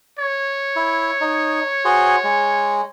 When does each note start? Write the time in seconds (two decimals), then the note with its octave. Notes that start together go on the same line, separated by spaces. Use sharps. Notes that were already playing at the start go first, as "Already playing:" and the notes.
0.19 C#5
0.76 E4
1.21 D#4
1.85 F#4 G#4 C5
2.24 G#3